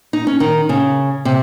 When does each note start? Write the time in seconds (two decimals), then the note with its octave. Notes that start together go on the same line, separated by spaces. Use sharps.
0.13 D#4
0.27 C#4
0.40 D#3
0.69 C#3
1.25 C3